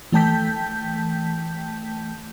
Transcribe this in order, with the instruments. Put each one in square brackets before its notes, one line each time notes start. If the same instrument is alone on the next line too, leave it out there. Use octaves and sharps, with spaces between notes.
[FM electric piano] E3 A3 G5 A5 G6 B6